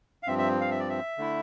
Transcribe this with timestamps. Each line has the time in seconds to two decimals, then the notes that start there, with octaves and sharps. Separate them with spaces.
0.23 F5
0.27 G2 F3 C4 E5
0.38 E5
0.61 F5
0.71 E5
0.80 D5
0.89 E5
1.18 D3 A3 E4